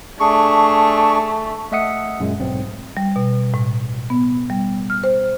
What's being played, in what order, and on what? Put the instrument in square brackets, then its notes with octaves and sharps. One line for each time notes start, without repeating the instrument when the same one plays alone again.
[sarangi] A3 [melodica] D4 G#4 C#6
[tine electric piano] A3 D#5 E5 F#5 D#6 C#7
F#2 A#2 G#3
B1 G#2 C4
[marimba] G3
B2
A2
B3
G3
F6
C5